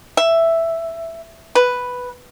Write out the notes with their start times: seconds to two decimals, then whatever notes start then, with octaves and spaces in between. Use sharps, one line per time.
0.17 E5
1.55 B4